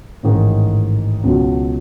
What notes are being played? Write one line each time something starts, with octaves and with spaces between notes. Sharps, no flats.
A1 G#2 D#3 G#3
C#2 B2 F#3